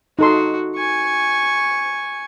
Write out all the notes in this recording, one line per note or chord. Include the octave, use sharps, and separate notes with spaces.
D#4 F#4 A4 C6
G#5 C#6